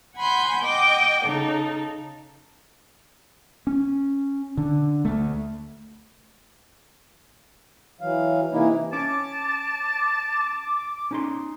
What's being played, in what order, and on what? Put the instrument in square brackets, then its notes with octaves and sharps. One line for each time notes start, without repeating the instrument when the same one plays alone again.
[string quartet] F#5 G#5 B5 C6 G6
D#5 F#5 G5 D6
C#3 D#4 A4
[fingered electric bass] C#4
D3
D2 A3
[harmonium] E3 F#3 F5
C3 E3 A#3 D#4 E4
[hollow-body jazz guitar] C#4 [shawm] A5 [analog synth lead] D6
[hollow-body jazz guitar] C#4 D#4 C6